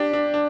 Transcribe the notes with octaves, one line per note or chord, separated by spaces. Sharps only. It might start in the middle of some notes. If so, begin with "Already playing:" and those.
Already playing: D4 G4
D4
D4